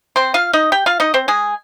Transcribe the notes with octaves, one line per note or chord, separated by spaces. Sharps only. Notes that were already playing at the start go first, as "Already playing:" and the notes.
C4 C5
F4 F5
D#4 D#5
G4 G5
F4 F5
D#4 D#5
C4 C5
G#3 G#4